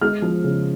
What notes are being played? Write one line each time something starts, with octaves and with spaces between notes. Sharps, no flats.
G#3 F6
F3
C#3